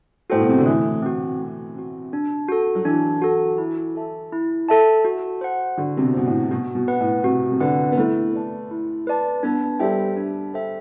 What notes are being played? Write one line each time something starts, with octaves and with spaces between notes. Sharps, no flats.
A2 F#4 A4 C5 G5
B2
C3
D3
E3 A3
C4 F#4
A3
C4 F#4
D4
F#4 A4
F#3
E3 D4
F#4 A4
E4
A4 E5 A5
E4
A4 E5 A5
F#4
C5 F#5
D3 F#4
C3
B2
B2 C5 F#5
A2
B2 F#4
B2
B4 F#5
A2
C3 F#4
C3
D3 B4 F#5
B3
A3 E4
B4 D5 A5
E4
B4 D5 A5
B3 D4
G3 A4 C5 E5 G5
D4
A4 C5 E5 G5